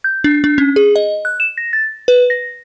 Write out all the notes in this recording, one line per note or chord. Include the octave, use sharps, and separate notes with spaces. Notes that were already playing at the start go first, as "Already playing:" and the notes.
G6
D4
D4
C#4
G#4
D#5
F#6
E7
A#6
A6
B4
A#6